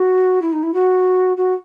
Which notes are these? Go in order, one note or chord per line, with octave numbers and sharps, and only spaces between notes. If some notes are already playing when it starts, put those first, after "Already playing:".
Already playing: F#4
E4
D#4
E4
F#4
F#4